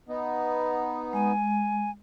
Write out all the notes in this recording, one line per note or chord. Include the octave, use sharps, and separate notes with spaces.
B3 D#4
G#3 G#5